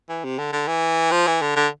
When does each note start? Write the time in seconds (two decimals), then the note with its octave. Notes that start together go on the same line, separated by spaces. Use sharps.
0.09 E3
0.24 C3
0.39 D3
0.53 D3
0.68 E3
1.11 F3
1.27 E3
1.42 D3
1.56 D3